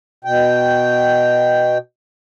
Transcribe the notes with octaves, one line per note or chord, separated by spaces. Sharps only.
B2 G5